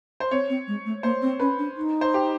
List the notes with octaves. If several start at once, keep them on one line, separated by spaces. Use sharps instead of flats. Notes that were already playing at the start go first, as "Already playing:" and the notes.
C5
C4 C#5
C4
G#3
A3
A#3 C5
C4
C#4 B4
D4
D#4
C5
G4